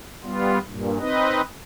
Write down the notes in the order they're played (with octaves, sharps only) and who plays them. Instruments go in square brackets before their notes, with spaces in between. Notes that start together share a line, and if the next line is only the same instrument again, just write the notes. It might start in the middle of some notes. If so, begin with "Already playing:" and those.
[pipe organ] G3 B3 F4
G2 A#2
C4 D#4 B4 D#5